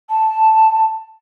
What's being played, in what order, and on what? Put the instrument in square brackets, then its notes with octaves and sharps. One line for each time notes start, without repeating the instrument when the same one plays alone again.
[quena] A5